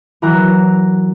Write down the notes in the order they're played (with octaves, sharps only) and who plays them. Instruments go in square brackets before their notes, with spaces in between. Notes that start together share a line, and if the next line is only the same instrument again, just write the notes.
[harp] E3 F#3 A#4 A#5 F#6